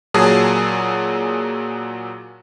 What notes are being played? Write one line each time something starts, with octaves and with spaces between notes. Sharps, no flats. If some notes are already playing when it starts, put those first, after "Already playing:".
A#2 F#3 G#4 A5 D#6